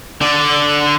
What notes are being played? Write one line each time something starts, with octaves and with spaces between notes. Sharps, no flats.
D3 D5